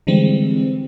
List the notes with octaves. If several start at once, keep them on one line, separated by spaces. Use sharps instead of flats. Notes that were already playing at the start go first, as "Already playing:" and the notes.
D3 E3 G3 G#3 C4